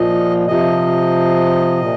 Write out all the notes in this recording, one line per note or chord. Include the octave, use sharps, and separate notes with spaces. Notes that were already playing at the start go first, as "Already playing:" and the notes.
Already playing: A#2 F3 D#5
C3 F3 D#5
A#2